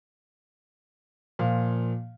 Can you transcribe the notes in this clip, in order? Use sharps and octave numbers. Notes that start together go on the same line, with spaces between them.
A#2 F3 F5